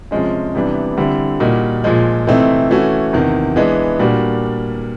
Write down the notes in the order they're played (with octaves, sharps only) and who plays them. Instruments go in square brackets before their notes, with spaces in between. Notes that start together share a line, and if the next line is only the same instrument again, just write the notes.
[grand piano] C3 F3 G#3 C#4
C3 E3 G3 B3 D4
D3 G3 C4 E4
A#2 G3 A#3 D#4 F#4
A#2 F3 G#3
C3 E3 A3 C4 D#4
E3 A3 C#4 F#4
E2 C3 D#3
E3 G#3 B3 D4
A#2 G3 A#3 D4 F#4